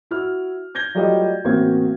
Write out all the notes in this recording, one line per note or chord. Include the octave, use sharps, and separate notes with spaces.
E4 F#4 F6
G6 G#6 A#6 G7
F#3 G3 A3 F4 G4 D#5
A1 A#3 C4 F#4 G#6